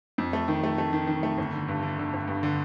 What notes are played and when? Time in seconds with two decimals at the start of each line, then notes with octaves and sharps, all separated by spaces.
0.18 F2
0.33 A3
0.48 D#3
0.64 A3
0.78 A3
0.93 D#3
1.07 D#3
1.23 A3
1.38 G1
1.53 D3
1.68 G2
1.83 D3
1.98 D3
2.14 G1
2.28 G2
2.43 D3